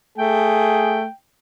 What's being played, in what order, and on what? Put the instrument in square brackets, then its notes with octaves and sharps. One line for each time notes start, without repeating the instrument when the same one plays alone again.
[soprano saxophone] A3 [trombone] G#4 [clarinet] G5